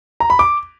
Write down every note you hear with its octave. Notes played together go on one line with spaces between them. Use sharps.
A#5
B5
D6